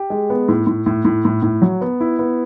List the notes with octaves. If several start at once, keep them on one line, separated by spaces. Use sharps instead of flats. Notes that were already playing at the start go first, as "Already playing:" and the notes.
Already playing: G4
G#3
B3
A2
A2
A2
A2
A2
A2
F#3
B3
E4
B3